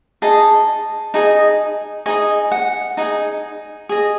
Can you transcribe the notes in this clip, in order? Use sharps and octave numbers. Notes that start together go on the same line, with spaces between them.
D#4 G#4 D#5 A5
D#4 G#4 D#5
D#4 G#4 D#5 G#5
F#5
D#4 G#4
G#4 D#5